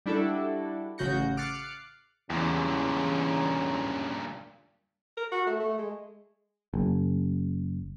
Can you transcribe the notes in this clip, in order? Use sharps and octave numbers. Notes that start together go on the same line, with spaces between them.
G3 D4 E4 F#4 A4
A1 C#3 F#4 G6 A#6 C#7
D6 F6 F#6 A6 C7 C#7
E2 G2 A#2 C#3
A#4
F#4
A3
A3
G#3
F#1